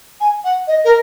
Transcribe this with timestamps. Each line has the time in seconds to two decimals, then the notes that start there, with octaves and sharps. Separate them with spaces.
0.20 G#5
0.44 F#5
0.67 D#5
0.85 A#4